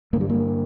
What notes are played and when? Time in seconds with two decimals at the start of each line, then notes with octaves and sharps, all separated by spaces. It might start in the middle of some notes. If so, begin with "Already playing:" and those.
0.13 G2 D3 A#3
0.21 G3
0.29 A#3